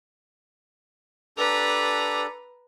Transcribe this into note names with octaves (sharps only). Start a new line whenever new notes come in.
D4 G4 A4 B4 A#5